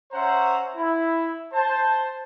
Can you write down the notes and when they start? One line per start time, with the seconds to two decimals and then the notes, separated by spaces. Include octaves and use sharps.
0.13 C#4 C5 C#5 E5 F#5 A#5
0.76 E4
1.53 C5 A5